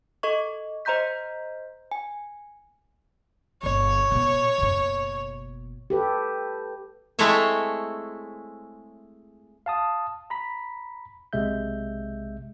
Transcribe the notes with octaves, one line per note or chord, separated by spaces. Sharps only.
A4 D#5 C#6
C5 D#5 A#5 C6 G6 B6
G#5
G1 B2 C#5
B2 B3
F#1 B2
G4 A4 B4
G#3 A3 C4 E4 C#5 E5
F5 A5 D#6
A#5 B5 B6
B1 C3 G#3 E5 G6